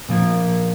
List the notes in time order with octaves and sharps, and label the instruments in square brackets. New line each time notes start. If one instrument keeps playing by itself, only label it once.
[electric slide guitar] A#2 F3 A#3